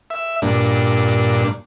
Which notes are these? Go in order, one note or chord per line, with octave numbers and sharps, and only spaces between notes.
E5
G2 A#2 D4